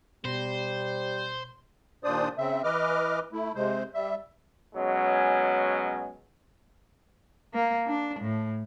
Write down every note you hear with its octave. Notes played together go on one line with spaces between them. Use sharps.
B2 G3 C5
D#2 A#2 D4 C5 D5 D#6
C#3 C4 E5
E3 B4 D#5 D6 F6
A3 E4
C3 G#3 C5
G3 E5
B2 F#3 G#3 C#4
A#3
D4
A2